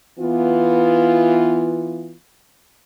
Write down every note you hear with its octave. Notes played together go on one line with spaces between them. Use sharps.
E3 B3 F4